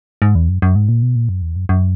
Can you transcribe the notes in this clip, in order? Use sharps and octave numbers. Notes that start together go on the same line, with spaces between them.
G#2
E2
F#2
F#2
G#2
A#2
B2
A#2
F#2
E2
F#2
F#2